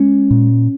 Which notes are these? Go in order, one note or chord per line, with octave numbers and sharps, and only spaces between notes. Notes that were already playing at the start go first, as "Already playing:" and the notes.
Already playing: G#3 C#4
A#2